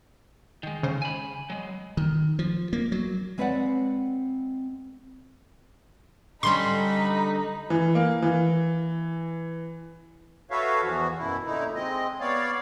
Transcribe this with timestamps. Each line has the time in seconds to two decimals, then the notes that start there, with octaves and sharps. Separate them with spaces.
0.63 D#3 G#3
0.83 C#3 C5
1.02 G#5 B5
1.50 F#3 G#3
1.97 D#3
2.39 F3
2.73 A#3
2.92 F#3
3.38 G#3 C4 B4 C#5 D5 F#5
6.43 D3 G3 C#4 D#4 B5 C6
7.70 E3
7.95 A#3
8.22 E3
10.51 F#4 A4 B4 C#5 E5 F5
10.84 E2 E3 F3 F#4
11.18 F#2 B2 E4
11.46 A#2 D3 D#4 E4
11.75 G#3 C4 D#5
12.21 B3 C#5 D5 F5